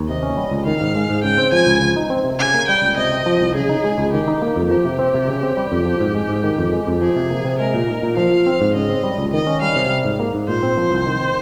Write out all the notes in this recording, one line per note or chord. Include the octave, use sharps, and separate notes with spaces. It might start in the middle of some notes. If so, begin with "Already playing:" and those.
Already playing: D#2
C3 D#5
C#4
G3
C#2
D#3 F5
G#2
G#3
G#2
C#3 G5
C4
F3 G#5
C#2
F3
D#4
C4
C3
C#3 G#5
A#3
G3 G5
C#2
C3 D#5
C4
F3
C2
C#3 G#4
D#4
G#3
C#2
D#3 G4
D#4
A#3
F2
F3 G4
C3
C4
C3
C#3
C4
G3
F2
F3
G#2
G#3
G#2
D#3
F2
G#3
F2
F3 G#4
C3
A#3
C3
G#3 A#4
A#2
D#4
A#2
F3 F5
F4
C4
G#2
C#3 D#5
C4
G3
C#2
D#3 D#5
C#4
G3 F5
C3
G3
G#2
A#3
G#2
A#2 C5
C4
F3
C2
D#3
C4